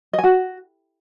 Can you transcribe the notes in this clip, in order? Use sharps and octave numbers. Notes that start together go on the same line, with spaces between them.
D#5
G#5
F#4